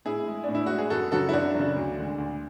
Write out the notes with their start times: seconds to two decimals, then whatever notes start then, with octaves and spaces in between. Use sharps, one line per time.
0.05 A2 E4 G#4
0.27 G#3
0.44 A2 D4
0.55 E4
0.66 G#3 F#4
0.78 G#4
0.90 F#2 F#4 A4
1.12 C#3 F#3 F#4 A4
1.29 E4
1.33 F#2 D4 F#4
1.55 C#3 F#3
1.76 D2
1.98 D3 G#3
2.18 D2